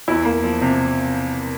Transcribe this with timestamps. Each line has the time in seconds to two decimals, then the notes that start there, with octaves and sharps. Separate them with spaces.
0.08 E2 E4
0.25 A#3
0.43 F3
0.61 C3